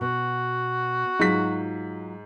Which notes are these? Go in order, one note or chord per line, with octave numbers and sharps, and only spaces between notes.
B2 F#4
G#2 F#3 F4 B6